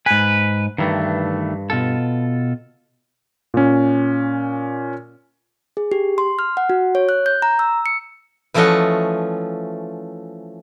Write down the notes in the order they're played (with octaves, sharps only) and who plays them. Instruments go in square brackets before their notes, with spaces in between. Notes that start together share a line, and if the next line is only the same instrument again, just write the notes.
[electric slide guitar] G#2 G#5 [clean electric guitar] B4
[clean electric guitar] G2 [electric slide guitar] D#3 E3 A3
[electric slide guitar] B2 F4 A4
[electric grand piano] A#2 C#4
[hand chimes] G#4
G4
C6
F6
F#5
F#4
C#5
F#6
G6
A#5
E6
C#7
[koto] E3 F3 A3 C#4 D#5 F#5